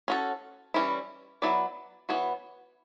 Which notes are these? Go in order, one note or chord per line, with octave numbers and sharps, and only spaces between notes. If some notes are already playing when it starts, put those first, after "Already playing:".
C#4 F#4 A4
E3 G3 C#4 E4
F#3 B3 E4 B4 D5
E3 B3 F#4 C#5